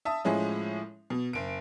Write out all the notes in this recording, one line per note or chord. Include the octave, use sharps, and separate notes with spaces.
E5 A5 D#6
A2 F3 G#3 C#4 E4
B2
F#1 D7